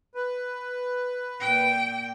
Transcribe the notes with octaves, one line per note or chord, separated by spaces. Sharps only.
B4
A#2 G5